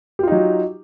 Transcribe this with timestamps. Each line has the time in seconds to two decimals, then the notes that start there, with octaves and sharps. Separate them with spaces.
0.19 G4
0.23 F4
0.28 D#4
0.32 F#3